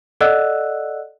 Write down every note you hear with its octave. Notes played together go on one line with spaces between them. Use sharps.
A4 D5 D#5 F#5 E6 F#6